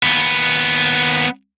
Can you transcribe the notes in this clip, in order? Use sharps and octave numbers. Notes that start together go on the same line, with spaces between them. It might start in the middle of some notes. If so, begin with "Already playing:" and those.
D#2 B3